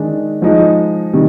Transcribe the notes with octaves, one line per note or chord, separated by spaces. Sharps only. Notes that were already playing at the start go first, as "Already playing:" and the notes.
Already playing: D#3 G#3 D4
F3 G#3 D#4 G#4
C3 D#3 G3